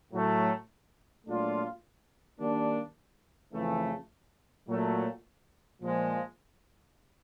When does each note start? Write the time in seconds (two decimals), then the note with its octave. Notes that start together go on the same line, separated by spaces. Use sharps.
0.11 A2 F#3 A3
1.26 A#2 F#3 A3 D4 F4
2.39 D#3 G3 A#3 D4
3.53 F2 C#3 E3 A3
4.67 A#2 F#3 A3
5.80 A#2 F3 G#3